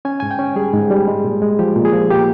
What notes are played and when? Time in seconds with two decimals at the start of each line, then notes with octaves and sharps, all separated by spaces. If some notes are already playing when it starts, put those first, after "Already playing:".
0.05 C#4 G#5
0.20 G#2 G#5
0.31 G5
0.39 C#4
0.56 G3 G#4
0.73 G#2
0.90 G3
1.08 G#3
1.24 A#2
1.42 G#3
1.59 F3 G4
1.76 A#2
1.85 G#4
1.93 F3
2.10 A#3 G4